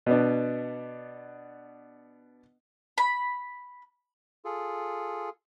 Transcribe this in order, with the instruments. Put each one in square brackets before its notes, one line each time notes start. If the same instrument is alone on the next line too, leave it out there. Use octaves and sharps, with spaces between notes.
[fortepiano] B2 B3 D4
[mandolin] B5
[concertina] F4 G#4 A4